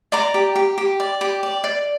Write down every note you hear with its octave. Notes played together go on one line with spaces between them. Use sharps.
D5 A#5 D6
G4
G4
G4
D5
G4
D5
D5